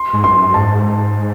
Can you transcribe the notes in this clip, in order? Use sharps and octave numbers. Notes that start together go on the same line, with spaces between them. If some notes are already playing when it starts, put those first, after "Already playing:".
Already playing: C6
G#2
F#2 C6
F#2
G#2 A5